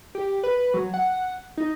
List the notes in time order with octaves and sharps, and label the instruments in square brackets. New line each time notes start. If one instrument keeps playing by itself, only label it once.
[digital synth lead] G4
B4
F#3
F#5
D#4